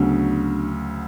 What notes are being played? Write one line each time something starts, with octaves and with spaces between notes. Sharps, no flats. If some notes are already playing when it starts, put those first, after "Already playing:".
Already playing: D2 C#3 F#3 B3 D4